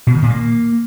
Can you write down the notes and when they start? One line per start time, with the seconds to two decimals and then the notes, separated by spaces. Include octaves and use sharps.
0.07 B2
0.15 D#3
0.22 A#2
0.30 A#3